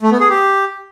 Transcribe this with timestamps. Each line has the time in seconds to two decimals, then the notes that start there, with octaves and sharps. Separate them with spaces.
0.02 A3
0.11 B3
0.20 G#4
0.30 G4